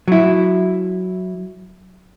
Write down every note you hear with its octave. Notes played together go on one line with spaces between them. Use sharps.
F#3 E4